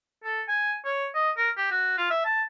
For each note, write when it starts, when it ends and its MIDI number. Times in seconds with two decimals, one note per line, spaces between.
0.24 0.42 69
0.48 0.75 80
0.85 1.07 73
1.15 1.31 75
1.37 1.50 70
1.57 1.70 67
1.71 1.95 66
1.98 2.09 65
2.11 2.25 76
2.25 2.43 81